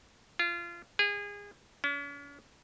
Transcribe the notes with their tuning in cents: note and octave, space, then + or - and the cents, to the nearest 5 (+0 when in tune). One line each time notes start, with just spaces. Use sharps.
F4 -25
G#4 -30
C#4 +45